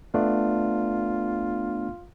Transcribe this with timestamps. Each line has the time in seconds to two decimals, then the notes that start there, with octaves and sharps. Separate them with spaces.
0.14 A3 B3 D4 F4